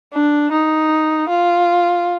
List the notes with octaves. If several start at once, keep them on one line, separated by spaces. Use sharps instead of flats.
D4
D#4
F4